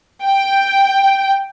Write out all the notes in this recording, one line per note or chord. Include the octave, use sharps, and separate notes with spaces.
G5